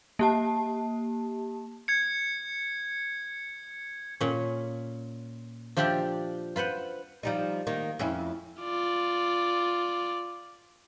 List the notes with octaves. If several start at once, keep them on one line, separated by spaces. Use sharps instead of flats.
A#3 G4 A5
G#6 C#7
A#2 C#4
F3 D4 F4 G4 D5 E5
F4 B4 C5 F#5
F3 G3 D#4
D#3 A#3
F2 C#4 E4
F4 D5